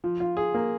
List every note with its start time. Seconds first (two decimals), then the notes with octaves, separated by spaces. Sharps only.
0.04 F3
0.20 F4
0.37 G#4
0.54 A#3